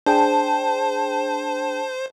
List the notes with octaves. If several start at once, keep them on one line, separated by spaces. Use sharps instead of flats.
D4 G#4 C5 G5 A5